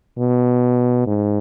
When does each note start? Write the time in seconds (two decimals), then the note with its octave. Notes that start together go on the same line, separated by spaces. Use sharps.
0.18 B2
1.07 G#2